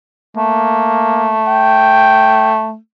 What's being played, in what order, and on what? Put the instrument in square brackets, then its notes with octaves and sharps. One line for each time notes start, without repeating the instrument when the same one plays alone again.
[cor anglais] A3 [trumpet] A#3
[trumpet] G5